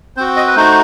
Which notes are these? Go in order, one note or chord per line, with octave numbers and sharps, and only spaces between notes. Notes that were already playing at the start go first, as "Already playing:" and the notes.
C4 F#4 C5
D#5
B4
A3 D#4 F#4 C5